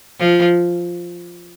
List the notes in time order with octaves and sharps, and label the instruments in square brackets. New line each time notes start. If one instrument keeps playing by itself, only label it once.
[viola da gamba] F3